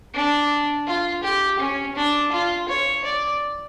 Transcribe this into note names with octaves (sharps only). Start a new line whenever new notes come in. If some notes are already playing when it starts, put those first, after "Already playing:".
D4
F4
G4
C#4
D4
F4
C#5
D5